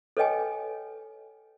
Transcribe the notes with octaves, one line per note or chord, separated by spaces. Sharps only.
A4 B4 C#5 D#5 G5 G#5